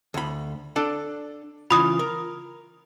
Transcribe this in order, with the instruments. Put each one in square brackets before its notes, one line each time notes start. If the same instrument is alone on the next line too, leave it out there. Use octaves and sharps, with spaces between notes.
[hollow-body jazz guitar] D2 B5
D4 A4 D5
[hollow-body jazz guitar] C#3 E3 F4 [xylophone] B5 D#6
[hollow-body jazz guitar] A#4